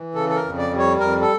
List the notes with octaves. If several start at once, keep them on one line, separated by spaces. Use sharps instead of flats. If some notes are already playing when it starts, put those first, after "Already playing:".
Already playing: E3
C#3 A4
A4
A#4
F2
D5
G3
C#5
F2 A#4
A4